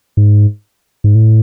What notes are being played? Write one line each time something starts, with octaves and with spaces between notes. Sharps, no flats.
G#2
G#2
A2